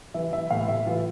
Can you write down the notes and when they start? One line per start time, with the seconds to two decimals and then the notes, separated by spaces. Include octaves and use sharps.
0.14 E3 E5
0.32 E3 E5
0.50 A2 F5
0.68 A2 E5
0.87 E3 F4